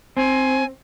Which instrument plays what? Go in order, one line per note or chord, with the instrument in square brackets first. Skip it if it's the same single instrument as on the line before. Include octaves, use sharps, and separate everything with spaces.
[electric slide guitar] C4 [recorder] G#5